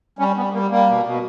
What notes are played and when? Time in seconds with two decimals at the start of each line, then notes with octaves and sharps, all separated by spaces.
0.19 G3 C#4
0.36 G3 B3
0.53 G3 A#3
0.71 G3 A#3
0.88 B2
1.05 B2